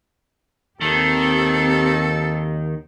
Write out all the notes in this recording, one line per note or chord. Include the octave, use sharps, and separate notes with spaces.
D#2 D#3 C4 G4 A4